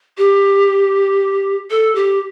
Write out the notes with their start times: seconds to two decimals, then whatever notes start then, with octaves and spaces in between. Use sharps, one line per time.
0.18 G4
1.71 A4
1.95 G4